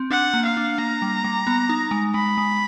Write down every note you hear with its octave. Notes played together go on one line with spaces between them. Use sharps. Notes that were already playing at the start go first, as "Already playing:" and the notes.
Already playing: C4
D4 F#5
A#3
F5
D4
A#3 A#5
G3
G3
B3
D#4
G#3
G#3 B5
G#3